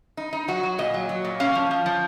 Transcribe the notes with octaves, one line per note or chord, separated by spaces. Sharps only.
D#4
D#4
F#3 F#4
F#3
A#2 D#5
F#3
F#3
A#2
C#4 F5
F3
F3
F3